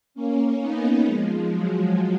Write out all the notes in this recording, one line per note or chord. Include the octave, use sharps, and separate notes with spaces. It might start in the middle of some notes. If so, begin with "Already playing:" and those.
A#3 C#4
B3 D#4
F3 G#3
F#3